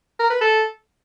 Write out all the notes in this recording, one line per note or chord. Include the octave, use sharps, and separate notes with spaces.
A#4
B4
A4